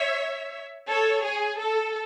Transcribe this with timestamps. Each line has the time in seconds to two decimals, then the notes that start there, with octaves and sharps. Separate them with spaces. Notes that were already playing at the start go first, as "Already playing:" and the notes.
Already playing: C#5 E5
0.88 A4 C#5
1.24 G#4
1.59 A4